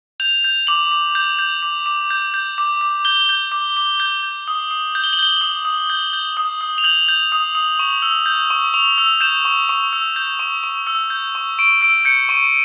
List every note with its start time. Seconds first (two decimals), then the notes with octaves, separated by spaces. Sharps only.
0.20 G6 F7
0.44 G6
0.67 D6 F#7
0.91 D6
1.15 G6
1.39 G6
1.62 D6
1.86 D6
2.10 G6
2.34 G6
2.58 D6
2.81 D6
3.05 G6 G7
3.29 G6
3.52 D6
3.77 D6
4.00 G6
4.23 G6
4.48 D#6
4.71 D#6
4.95 G6
5.04 G7
5.13 F#7
5.19 G6 G7
5.41 D#6
5.65 D#6
5.90 G6
6.13 G6
6.37 D#6
6.61 D#6
6.78 F7
6.84 G6 F#7
7.08 G6
7.32 D#6
7.55 D#6
7.79 C#6
8.02 E6
8.26 G6
8.50 C#6
8.74 C#6 F7
8.98 E6
9.21 G6 E7
9.45 C#6
9.69 C#6
9.93 E6
10.16 G6
10.39 C#6
10.63 C#6
10.87 E6
11.10 G6
11.35 C#6
11.59 C#6 D7
11.81 E6 D7
12.05 G6 C#7
12.29 C#6 D#7